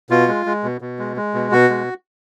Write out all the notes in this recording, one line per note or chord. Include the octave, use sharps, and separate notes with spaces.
B2 F4
G#3
G#3
B2
B2
G#3
G#3
B2
B2 F#4
G#3